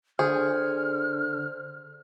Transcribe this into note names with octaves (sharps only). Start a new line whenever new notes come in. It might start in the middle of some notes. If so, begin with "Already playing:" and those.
D3 G#4 C5 F6